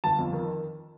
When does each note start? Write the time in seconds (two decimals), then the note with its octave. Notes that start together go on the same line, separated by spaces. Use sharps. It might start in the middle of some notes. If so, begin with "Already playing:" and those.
0.04 G1 A5
0.19 F2
0.33 D#3